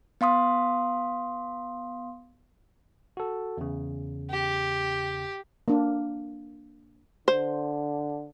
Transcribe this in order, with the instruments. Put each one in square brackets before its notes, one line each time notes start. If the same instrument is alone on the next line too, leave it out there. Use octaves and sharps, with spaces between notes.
[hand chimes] B3 F5 C6 D#6
[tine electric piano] F#4 A4
E2 C#3
[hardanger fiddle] G4
[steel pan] A#3 D4
[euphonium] D3 [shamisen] C5